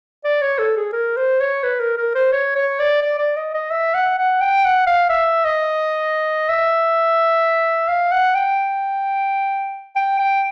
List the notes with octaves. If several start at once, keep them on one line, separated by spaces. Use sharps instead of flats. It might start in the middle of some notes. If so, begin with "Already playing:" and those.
D5
C#5
A4
G#4
A#4
C5
C#5
B4
A#4
A#4
C5
C#5
C#5
D5
D5
D5
D#5
D#5
E5
F#5
F#5
G5
F#5
F5
E5
D#5
E5
F5
F#5
G5
G5
G5